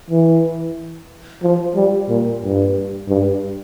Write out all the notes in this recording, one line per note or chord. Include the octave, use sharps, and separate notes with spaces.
E3
F3
G3
A#2
G2
G2